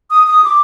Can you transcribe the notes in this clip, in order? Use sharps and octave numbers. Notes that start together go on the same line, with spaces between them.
D#6
D#6
D6